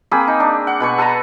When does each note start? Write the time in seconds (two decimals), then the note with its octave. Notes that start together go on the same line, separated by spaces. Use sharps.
0.11 A#3 C4 G#4 B5
0.27 D#4
0.40 D4
0.67 F#5
0.80 B2 B4 C#6
0.98 A4 B4 A5 A#5